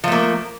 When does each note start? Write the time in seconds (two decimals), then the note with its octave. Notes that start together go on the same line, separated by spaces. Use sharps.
0.04 F3
0.08 A3
0.12 A#3